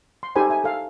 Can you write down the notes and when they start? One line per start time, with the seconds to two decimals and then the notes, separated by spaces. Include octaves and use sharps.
0.23 C6
0.36 D#4 G4 A4 C5 G#5 B5
0.50 E5 G#5
0.64 A4 F5